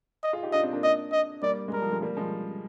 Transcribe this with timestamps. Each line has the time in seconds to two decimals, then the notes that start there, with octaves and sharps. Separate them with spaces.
0.23 D#5
0.33 F4 G#4
0.43 D#4 G4
0.53 D4 F4 D#5
0.63 C4 D#4
0.73 A#3 D4
0.84 D#5
1.12 D#5
1.42 G3 A#3 D5
1.68 G#3
1.73 G3 A#4
1.82 F3
1.92 F3 G#3
2.02 G3 A#3
2.17 F3 G#3